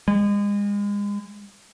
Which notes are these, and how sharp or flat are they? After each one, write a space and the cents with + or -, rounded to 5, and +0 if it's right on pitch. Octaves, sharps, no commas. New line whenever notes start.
G#3 -35